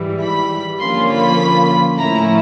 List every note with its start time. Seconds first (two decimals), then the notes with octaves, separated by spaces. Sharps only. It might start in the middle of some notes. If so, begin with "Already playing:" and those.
Already playing: G#2 E3 G3
0.22 B5
0.80 D3 F3 A#3 C#4 F4 C6
1.10 B5
1.97 A2 F3 A3 C#4 E4 A#5